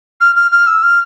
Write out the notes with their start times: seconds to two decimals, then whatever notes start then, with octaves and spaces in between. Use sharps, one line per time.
0.20 F6
0.35 F6
0.51 F6
0.67 E6
0.83 F6